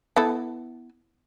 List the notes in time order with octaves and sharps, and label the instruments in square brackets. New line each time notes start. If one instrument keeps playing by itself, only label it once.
[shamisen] B3 E4 A4